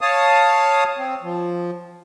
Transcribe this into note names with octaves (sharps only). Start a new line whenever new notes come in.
C#5 F5 A5 D#6
C4
F3